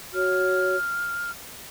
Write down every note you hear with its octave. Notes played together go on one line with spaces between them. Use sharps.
F#4 C#5 F6